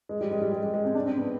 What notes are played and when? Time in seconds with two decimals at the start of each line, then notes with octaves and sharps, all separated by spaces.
0.09 G#3
0.21 G3
0.31 G#3
0.41 G3
0.52 G#3
0.63 G#3
0.74 G#3
0.85 C4
0.95 D4
1.06 C4
1.17 B3